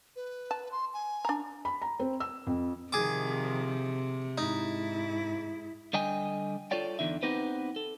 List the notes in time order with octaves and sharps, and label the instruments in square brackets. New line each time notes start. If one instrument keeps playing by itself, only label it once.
[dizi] B4
[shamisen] A5
[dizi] C6
G#5
[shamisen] D4 A#5
[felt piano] B5
A#5
C4
E6
F2
[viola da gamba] C3 [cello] D#3 F3 [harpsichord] G#4 D6
[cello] G#2 E4 [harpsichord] D#4
[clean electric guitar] D3 G3 D#5 G5 G#5
F4 A4 C#5 D5 G5
E2 D3 D#4 E5
B3 C4 D#4 G4 B4 C5
A4